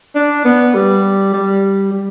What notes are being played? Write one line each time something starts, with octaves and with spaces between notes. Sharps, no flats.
D4
B3
G3
G3
G3